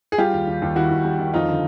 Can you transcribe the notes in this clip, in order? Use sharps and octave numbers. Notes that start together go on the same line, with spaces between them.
G#4
G3 F4 G4
D#2
D#2
D#2
D#3 E4 F#4
D#2
G3
D#3
F2 D#4 F4
D3